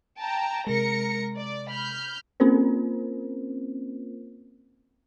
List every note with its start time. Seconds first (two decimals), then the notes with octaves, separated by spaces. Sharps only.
0.19 G5 A5 A#5
0.67 C3 G#3 A#4 A#6 C#7
1.37 D5
1.69 B5 F6 G6
2.40 A#3 C4 C#4 F4 A#4 C5